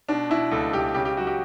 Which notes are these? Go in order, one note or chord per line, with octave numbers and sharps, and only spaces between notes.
B2 D4
B2 E4
C#2 A4
C#2 G4
C#3 G4
G4
F#3 F#4
G4